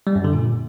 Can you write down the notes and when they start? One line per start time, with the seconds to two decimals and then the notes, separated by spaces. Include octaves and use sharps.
0.07 G3
0.16 F#2
0.24 D3
0.33 A#2